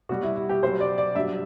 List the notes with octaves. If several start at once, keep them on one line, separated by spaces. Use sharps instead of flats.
B2 G3 F#4
E4
E4
G4
B2 F#3 C5
D5
D5
G2 F#3 E5